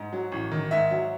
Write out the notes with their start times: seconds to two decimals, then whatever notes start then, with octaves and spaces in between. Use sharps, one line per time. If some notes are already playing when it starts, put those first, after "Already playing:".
Already playing: G#2
0.13 F#3
0.32 A1
0.51 D#3
0.71 G#2 E5
0.91 F#3